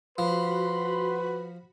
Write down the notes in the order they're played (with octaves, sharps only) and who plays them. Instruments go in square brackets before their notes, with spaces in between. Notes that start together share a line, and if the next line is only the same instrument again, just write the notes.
[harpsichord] F3 [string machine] F#4 B5 [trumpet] B4 [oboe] C6